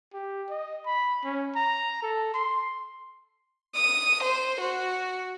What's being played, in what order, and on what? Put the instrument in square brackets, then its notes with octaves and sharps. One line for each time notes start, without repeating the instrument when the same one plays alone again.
[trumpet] G4
D#5
B5
C#4
A#5
A4
C6
[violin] D#6
C5
F#4